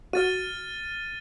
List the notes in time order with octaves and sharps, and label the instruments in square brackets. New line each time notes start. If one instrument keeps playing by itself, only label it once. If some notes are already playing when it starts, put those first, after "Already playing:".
[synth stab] F#4 [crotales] F6 A6 D#7